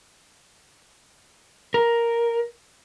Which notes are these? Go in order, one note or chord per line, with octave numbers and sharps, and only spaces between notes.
A#4